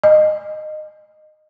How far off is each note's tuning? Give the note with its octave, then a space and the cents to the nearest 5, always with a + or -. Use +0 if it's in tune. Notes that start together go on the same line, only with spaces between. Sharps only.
D#5 -20